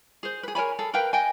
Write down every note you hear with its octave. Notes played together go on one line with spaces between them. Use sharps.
G#4 C5
G#4 B4
A#4 C#5 G#5 B5
G#4 A4
A#4 B4 F5 G5
D#5 G5 G#5